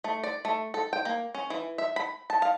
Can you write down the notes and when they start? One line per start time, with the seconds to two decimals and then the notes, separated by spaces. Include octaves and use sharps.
0.04 A3
0.24 D5
0.45 A3
0.74 A4
0.93 G5
1.05 A#3
1.35 C#4
1.50 E3
1.78 E5
1.96 B5
2.30 A5
2.42 F5